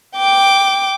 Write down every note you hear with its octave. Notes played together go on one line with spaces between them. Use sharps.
G5 D6